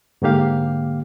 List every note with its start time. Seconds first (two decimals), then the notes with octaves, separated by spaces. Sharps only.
0.22 G#2 D3 A#3 G4 F5